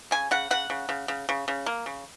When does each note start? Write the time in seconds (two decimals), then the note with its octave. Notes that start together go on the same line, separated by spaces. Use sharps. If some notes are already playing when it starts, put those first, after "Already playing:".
0.11 C#3 G#5
0.31 C#3 F#5
0.51 C#3 F#5
0.70 C#3
0.89 C#3
1.08 C#3
1.29 C#3
1.48 C#3
1.66 A#3
1.86 C#3